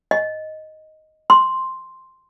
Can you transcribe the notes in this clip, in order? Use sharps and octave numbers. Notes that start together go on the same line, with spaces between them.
D#5
C6